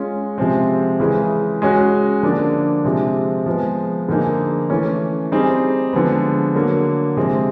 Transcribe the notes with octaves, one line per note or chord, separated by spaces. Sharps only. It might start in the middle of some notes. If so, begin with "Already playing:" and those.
Already playing: G#3 C#4 F4
C3 F3 G#3 C4
C#3 E3 G#3
G#3 C#4 F#4
D3 F3 A#3 D4
C3 F3 G#3 C4
F3 G#3 B3
D3 F3 A#3 D#4 G#4
E3 A3 C#4
G3 C4 D#4 G#4
D3 F3 G#3 B3
D3 F#3 A#3
C3 F3 G#3 C4